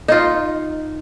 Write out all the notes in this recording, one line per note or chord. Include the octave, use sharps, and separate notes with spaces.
D#4 F4